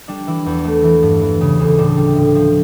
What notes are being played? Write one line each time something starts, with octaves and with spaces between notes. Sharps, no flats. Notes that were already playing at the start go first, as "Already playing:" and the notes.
G3 D4
E3 E4
E2 E4
A3
E3
G2
E3
C#3
D2
A2 D4
G3
A2
F3